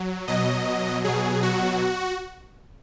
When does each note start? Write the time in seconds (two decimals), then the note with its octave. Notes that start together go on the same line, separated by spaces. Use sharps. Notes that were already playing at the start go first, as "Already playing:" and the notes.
Already playing: F#3
0.28 B2 F#3 D#5
1.04 B2 F#3 G#4
1.43 F#4